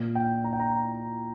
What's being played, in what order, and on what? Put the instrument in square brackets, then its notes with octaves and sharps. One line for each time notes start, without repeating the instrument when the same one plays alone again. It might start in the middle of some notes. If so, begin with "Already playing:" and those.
Already playing: [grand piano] A#2
G5
A#5
G5
A#5